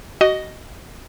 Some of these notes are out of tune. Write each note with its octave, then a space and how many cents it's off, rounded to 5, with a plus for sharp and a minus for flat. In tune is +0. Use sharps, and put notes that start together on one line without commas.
F#4 +30 D#5 +0